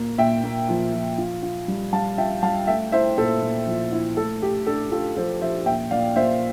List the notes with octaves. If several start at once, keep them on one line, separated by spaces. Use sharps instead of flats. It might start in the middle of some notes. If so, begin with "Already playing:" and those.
Already playing: A#2 A#3
A#2 E5 G5
A#3
F3
F3
F4
F4
G3
G3 F5 A5
F4 E5 G5
G3 F5 A5
A3 E5 G5
E4 C5 E5
A#2 A4 C5
A#2
F3
E4
A3 A4
A3 G4
D4 A4
F4 A4
F3 A4 C5
F3 C5 E5
A#2 E5 G5
A#2 D5 F5
A#2 C5 E5